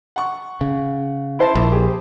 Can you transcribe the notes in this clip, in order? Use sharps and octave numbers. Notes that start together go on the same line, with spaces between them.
F#5 C#6
C#3
E4 C5 A5
A#1
G4 G#4